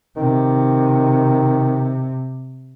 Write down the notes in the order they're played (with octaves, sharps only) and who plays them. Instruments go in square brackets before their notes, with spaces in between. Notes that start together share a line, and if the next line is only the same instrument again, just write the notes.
[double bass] C3 [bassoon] D#3